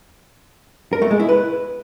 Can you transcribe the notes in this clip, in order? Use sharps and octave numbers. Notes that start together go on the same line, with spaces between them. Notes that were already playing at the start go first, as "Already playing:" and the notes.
A#4
A3
G#3
E4
B4